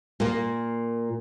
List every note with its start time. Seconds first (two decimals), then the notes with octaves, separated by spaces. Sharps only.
0.20 A#2 A#3